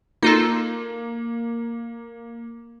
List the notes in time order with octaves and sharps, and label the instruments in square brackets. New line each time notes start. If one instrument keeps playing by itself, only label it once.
[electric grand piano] A#3 [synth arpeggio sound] D#4 F4 A4